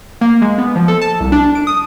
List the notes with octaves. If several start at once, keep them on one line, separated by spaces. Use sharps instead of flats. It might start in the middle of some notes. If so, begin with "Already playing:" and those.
A#3
G#3
B3
F3
A4
A5
C2
D4
D7
D#6